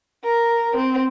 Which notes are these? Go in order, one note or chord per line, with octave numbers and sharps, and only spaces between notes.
A#4
C4